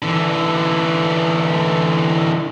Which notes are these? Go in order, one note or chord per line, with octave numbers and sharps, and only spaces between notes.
D3 E3